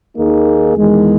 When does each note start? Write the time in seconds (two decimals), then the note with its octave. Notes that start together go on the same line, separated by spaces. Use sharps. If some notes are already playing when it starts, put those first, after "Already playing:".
0.16 D#2 D#3 A#3 D#4 G#4
0.76 E2 D#3 G#3